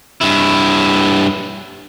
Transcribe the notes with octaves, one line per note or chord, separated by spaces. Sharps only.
G2 E4